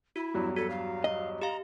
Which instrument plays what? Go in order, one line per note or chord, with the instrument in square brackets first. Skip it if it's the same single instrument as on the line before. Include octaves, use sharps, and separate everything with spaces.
[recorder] E4 [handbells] F#4
[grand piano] E2 G2 F#3
[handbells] F#4 [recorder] A4
[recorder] F5
[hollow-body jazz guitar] D#5
[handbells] G4 F5 [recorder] A#5